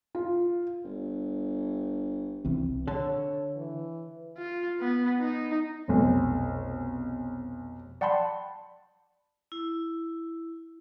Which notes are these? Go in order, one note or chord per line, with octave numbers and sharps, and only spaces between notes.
F4
G1
C2 E3 C4
D3 A4 C#5
E3
F4
B3
D#4
F1 B1
D5 F#5 G5 A5 B5 C6
E4